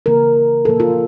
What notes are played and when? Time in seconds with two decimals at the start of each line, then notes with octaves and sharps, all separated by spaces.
0.06 C#3 E3 A#3 A#4
0.65 A#2 F3 A#3 A4
0.80 F4